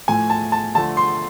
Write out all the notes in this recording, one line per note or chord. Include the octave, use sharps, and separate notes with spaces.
A2 F3 A3 G#5
A5
A5
D3 F3 A3 A5
C6